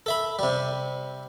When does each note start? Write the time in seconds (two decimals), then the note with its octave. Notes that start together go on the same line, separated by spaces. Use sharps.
0.06 A4 E5 B5
0.39 C3 G3